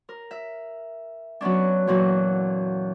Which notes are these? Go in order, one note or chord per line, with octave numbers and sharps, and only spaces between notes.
A#4
E5
F#3 B3 C#4 D4
E2 A#2 F#3